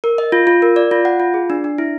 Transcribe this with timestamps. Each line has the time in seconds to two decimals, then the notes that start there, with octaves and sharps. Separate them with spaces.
0.04 A#4
0.18 D#5
0.32 F4
0.47 F4
0.62 A#4
0.76 D5
0.91 F4
1.05 F#5
1.20 F4
1.34 G#4
1.50 D4
1.64 D4
1.78 E4